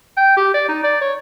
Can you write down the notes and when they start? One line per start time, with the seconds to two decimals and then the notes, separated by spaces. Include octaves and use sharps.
0.17 G5
0.37 G4
0.54 D5
0.69 D#4
0.84 D5
1.01 C#5